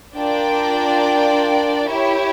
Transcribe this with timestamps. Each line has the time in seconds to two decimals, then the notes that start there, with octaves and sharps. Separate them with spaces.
0.15 D4 F4 A#4 D5 G5
1.89 E4 G4 C#5